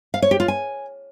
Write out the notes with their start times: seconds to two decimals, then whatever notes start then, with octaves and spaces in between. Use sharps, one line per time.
0.14 F5
0.22 C#5
0.31 G4
0.40 F4
0.48 G#5